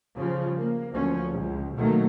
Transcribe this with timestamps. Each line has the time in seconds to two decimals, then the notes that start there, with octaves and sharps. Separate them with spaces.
0.17 C#3 F3 G3
0.57 A#3
0.91 D2 F3 F#3 C#4
1.32 C#2
1.76 B2 D#3 F#3 A3 A#3